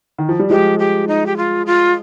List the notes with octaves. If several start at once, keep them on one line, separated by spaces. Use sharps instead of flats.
D#3
F3
G3
F3 G#3 G4
G4
D#4
G4
F4
F4